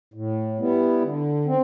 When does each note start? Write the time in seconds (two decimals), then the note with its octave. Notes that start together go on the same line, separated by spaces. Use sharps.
0.14 A2
0.59 G3 B3 E4
1.02 D3
1.47 C4